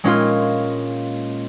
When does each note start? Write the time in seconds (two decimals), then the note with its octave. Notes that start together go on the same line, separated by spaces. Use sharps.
0.04 A#2 G#3 C#4 F4